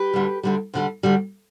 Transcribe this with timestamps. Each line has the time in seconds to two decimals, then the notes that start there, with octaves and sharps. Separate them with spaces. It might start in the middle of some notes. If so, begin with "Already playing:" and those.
Already playing: G4 B4
0.13 D2 D3 G3
0.43 D2 D3 G3
0.74 D2 D3 G3
1.03 D2 D3 G3